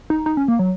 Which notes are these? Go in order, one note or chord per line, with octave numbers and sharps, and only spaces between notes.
D#4
D#4
C#4
A#3
F#3